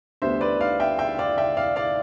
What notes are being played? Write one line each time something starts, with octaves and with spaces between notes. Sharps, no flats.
D2 D3 G3 B3 C5 E5
B4 D5
D5 F5
E5 G5
E5 G5
D5 F5
E5 G5
D5 F5
D5 F5